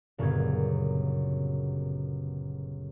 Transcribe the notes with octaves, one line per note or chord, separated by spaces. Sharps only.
G1 F#2 A#2 C#3 B3 G#6